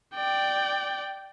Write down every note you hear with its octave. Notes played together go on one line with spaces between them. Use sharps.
D5 G5